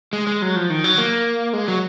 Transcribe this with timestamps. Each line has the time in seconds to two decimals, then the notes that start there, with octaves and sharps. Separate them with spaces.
0.13 G#3
0.27 G#3
0.42 F#3
0.56 F3
0.70 D#3
0.84 F#3
0.98 A#3
1.53 G#3
1.68 F#3